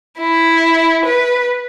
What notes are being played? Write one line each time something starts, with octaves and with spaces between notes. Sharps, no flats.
E4
B4